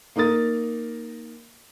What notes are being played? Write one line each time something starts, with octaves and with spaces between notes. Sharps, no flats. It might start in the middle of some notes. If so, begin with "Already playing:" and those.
A#3 D#4 A#4 D#6 A6